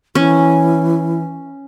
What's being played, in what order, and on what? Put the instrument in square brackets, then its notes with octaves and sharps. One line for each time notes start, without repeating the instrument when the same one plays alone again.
[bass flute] E3 [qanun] C#4